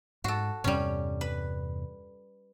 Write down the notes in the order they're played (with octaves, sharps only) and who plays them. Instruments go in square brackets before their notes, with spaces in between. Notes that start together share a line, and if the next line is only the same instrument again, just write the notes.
[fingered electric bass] G#2 [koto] F#4 A4
[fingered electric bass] E2 G2 C3 [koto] G3 C#4
[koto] B4